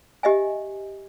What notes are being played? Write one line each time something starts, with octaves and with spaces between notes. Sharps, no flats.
G4 D#5 E5 G#5